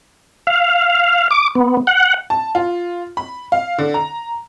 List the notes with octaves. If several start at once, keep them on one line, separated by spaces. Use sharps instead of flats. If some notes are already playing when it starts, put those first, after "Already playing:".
F5
D6
B3
F#5
A5
F4
B5
F5
D3
A#5